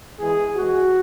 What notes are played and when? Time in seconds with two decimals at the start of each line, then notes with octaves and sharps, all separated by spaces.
0.19 E2 E3 G#3 G#4
0.56 E2 E3 G#3 F#4